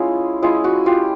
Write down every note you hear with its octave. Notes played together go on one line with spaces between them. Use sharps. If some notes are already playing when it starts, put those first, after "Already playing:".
Already playing: G#3 C#4 E4 F4
G#3 C#4 E4 F4
F#4
F4 G4